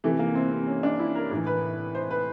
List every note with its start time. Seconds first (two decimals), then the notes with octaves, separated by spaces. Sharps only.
0.04 C3 E3 A3
0.19 A#3
0.35 C4
0.52 C4
0.67 C#4
0.83 D4
0.99 E4
1.15 A#4
1.31 A2 E3 A#4
1.47 B4
1.95 C5
2.11 B4